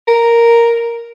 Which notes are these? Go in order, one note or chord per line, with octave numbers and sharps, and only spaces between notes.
A#4